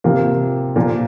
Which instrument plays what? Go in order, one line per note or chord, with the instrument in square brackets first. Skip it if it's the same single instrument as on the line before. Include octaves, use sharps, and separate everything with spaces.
[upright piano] C3 F3 A#3
A#2 F3 A#3